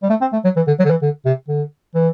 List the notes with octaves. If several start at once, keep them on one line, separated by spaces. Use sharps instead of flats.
G3
A3
C4
A3
F#3
E3
D3
F#3
D3
E3
D3
C3
D3
E3